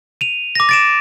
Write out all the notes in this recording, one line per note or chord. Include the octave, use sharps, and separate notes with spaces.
D#7 F7
D6 A#6
A6 D7 E7